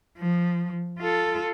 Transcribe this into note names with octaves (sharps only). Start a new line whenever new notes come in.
F3
F4 A4